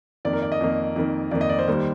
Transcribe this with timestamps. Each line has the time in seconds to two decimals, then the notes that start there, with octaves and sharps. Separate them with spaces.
0.25 F2 D#3 A#3 D5
0.33 A#4
0.42 D5
0.52 D#5
0.61 F2 D#3 A#3
0.96 F2 D#3 A#3
1.31 F2 D#3 A#3 D5
1.41 D#5
1.49 D5
1.59 C5
1.68 D#2 D#3 G3 A#3